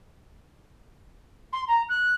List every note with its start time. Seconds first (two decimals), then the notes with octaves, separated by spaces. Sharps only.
1.52 C6
1.67 A#5
1.89 F#6